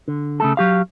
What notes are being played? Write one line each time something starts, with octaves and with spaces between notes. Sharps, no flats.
D3
C#3 A3 A4
F#3 G4 F5